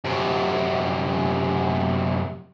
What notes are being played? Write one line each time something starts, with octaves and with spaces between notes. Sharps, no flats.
F#2 C3